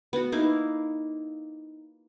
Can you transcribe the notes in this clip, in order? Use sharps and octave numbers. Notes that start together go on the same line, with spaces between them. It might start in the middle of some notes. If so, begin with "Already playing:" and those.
B3 F#4
A#3 D#4 E4 F5